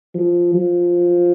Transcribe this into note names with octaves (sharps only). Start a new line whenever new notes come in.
F3
F3